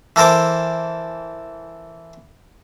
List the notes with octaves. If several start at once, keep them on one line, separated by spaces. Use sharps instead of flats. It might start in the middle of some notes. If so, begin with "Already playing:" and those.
E3 A4 A#4 C5 D6